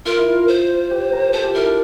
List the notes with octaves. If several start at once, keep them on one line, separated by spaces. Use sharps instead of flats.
F4 A#4
E4
F4
C5
G4
A#4
A4 C5
G4
E4 A#4
D4